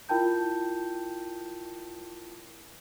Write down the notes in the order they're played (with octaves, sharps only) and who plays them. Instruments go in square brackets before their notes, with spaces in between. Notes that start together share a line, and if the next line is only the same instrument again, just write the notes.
[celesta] E4 F4 A#4 G5 A5 G6